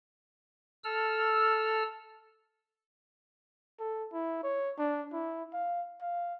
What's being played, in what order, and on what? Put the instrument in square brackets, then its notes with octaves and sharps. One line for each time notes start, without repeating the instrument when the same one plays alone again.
[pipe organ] A4 E6 F6
[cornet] A4
E4
C#5
D4
E4
F5
F5